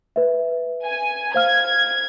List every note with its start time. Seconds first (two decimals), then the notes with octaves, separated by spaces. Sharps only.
0.16 B4 E5
0.85 G#5
1.34 C5 F5 F6 G#6